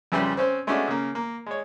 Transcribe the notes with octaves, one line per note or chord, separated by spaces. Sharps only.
F2 C#3 E3 G3 G5 C6
C4 C#4 C5
G#3 A3 B3 C#4 D4 F#4
C#3 A#3
A#3
G#3 C#5